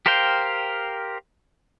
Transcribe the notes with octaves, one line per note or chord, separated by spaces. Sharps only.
G4 A#4 C5 F5 G5